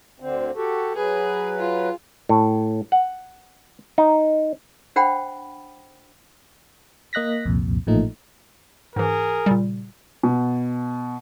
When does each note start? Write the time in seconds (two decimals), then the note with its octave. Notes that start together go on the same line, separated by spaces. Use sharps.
0.20 D2 D3 C4
0.55 F#4 G4 A4
0.95 F#3 G#4 B4
1.58 F4
2.29 A2
2.92 F#5
3.98 D#4
4.96 D4 C5 F#5 G5 B5
7.13 A#3 D#5 F#6 A#6 B6
7.46 C2 F2 A#2
7.87 A1 A#2 F3 A3 D#4
8.96 G#2 E3 G#4 A#4
9.46 A#2 C#3 G3
10.23 B2